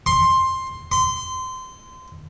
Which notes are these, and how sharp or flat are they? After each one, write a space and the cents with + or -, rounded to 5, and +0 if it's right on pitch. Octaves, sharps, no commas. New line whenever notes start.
C6 +10
C6 -25